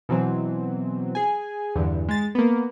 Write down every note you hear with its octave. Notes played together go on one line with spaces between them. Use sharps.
B2 E3 F#3 C4
G#4 G#5
E2 G2 D3
G#3 A6
A#3 B3